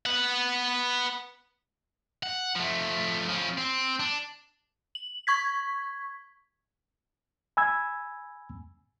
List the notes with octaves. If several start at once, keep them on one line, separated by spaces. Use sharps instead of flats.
B3 F#5
F#5
F3 A3
F3 C#4
C4
D4
F#7
C#6 G#6 B6
G#5 B5 E6 G#6